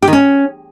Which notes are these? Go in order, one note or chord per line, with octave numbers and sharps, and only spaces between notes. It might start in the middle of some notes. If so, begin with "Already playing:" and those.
G4
D#3
C#4